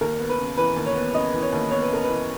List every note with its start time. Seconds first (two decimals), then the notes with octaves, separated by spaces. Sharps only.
0.01 D#2 A#4
0.20 B3
0.30 B4
0.38 C#3
0.57 E3 B4
0.76 D#2
0.86 C#5
0.95 B3
1.14 C#3 D#5
1.33 E3
1.42 C#5
1.52 D#2
1.71 B3 C#5
1.82 B4
1.89 C#3 A#4
2.04 E3 B4